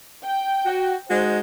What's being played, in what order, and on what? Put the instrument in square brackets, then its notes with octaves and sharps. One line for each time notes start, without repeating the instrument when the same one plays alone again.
[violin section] G5
[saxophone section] F#4
[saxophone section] G#3 D#4 F#4 [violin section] C5